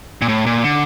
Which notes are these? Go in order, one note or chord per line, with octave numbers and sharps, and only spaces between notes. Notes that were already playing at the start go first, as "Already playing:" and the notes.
A#2
A2
A#2
D3